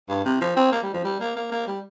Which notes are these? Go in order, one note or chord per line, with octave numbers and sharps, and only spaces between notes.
G2
C3
F3
C4
A#3
G3
F3
G3
A#3
A#3
A#3
G3